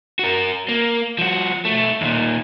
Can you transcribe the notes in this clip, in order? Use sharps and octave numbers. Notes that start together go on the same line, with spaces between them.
F#4 A#4
A#3
F3 F#4
B1 A3
D#2 A#2